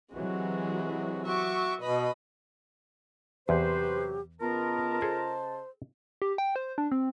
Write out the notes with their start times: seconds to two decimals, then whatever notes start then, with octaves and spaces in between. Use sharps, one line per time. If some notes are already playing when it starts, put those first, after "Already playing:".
0.13 C3 E3 F#3 G#3 F#4
1.25 F#4 E5 C#6 D6
1.81 B2 B4 D#5 B5
3.49 E2 C3 F#3 G4 B4 C5
4.41 C#3 B3 F4 A#4 D#5 A5
5.02 G#4 A4 C5 G#5
6.22 G4
6.38 G5
6.56 C5
6.78 D4
6.92 C4